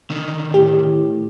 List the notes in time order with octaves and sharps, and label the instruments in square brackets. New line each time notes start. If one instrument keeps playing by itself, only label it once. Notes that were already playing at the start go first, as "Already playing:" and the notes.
[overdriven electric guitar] D3 D#3
[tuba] A2 [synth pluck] G4